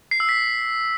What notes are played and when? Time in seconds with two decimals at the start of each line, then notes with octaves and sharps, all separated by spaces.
0.11 C7
0.20 E6
0.29 B6